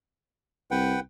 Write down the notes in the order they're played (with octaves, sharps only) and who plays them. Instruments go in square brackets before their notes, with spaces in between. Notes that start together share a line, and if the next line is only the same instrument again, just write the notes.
[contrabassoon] C2 [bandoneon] B4 F#5 G5